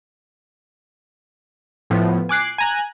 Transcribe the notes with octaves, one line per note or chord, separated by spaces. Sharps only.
A2 F3 B3
G#5 D6 F#6 C7
G#5 A#5 F#6